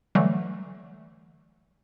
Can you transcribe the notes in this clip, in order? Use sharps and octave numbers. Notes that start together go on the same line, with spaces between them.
D3 E3 F#3 G3 A3